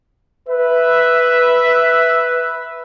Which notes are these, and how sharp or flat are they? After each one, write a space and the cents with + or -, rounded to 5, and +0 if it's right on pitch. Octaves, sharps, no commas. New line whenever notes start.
B4 +0 E5 +0